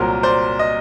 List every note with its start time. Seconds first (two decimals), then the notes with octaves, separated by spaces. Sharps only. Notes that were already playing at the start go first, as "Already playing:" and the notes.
Already playing: C2 A#2 F#3 A#4 C5
0.23 C5 D5
0.59 D#5